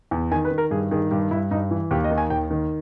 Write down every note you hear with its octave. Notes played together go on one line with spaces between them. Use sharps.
E2
D#3 G#5
B4
D#3
A#4
G2 G#4
D#3 G#4
G2 G4
G2 E4
G2 D#4
E3
D#2 G4
D#5
D#3
G#5
D#2 G5
D#3